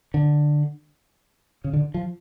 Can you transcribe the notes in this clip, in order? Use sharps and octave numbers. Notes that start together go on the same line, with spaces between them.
D3
C#3
D3
F3